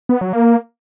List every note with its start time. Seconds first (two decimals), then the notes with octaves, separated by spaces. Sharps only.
0.09 B3
0.21 F#3
0.33 A#3